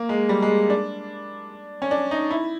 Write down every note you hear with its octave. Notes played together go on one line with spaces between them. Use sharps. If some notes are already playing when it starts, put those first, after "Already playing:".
Already playing: A#3
G#3
G3
G#3
D4
C#4
D4
D#4
E4